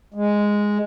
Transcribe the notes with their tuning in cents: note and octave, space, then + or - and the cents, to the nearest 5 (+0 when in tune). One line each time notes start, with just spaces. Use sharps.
G#3 -5